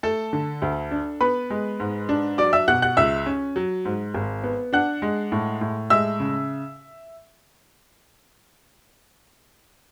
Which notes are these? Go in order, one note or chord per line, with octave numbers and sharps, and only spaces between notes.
A3 A4 A5
D3
D2
D4
B3 B4 B5
G#3
G#2
D4
F#3 D5 D6
E5 E6
B2 F#5 F#6
F#5 F#6
C#2 E5 E6
C#4
F#3
G#2
G#1
B3
D4 F#5 F#6
G#3
A2
A2
G#3 E5 E6
C#3